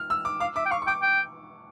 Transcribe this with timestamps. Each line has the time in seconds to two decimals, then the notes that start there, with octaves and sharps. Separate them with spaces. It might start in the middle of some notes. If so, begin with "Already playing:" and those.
Already playing: F6
0.10 E6
0.25 D6
0.40 F5 D6
0.56 E5 D6
0.66 G5
0.71 F5 C#6
0.82 C#6
0.87 G5 D6
1.02 G5